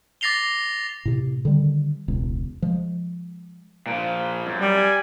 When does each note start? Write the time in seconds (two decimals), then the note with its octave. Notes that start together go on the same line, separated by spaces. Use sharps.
0.21 D6 A6 A#6 C7 F7 G7
1.05 A2 C3
1.45 D3 D#3 G3
2.08 E1 C#2
2.62 F3 G#3
3.86 A#2 F3
4.46 F#2
4.60 G3
4.78 G#5